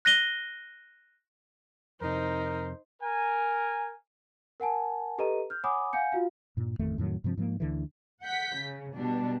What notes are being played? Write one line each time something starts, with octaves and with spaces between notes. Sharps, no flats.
F#6 A#6 D#7 G7
F2 C3 D#4 A#4 C5
A#4 G#5
A#4 F#5 G#5 A5
G4 A4 B4 D#5 A#5 D#7
F6 G6
C#5 F#5 G#5 B5 D6 D#6
F5 F#5 G#5 G6 C#7
F4 F#4 F5
G2 A#2
A1 F2 D#3 A3
F2 A2 D#3 F#3
G2 C3 F3 C4
G#2 F3 G#3 A#3
D2 D3 E3
F#5 G6 B6
C#3
B2 G3 D4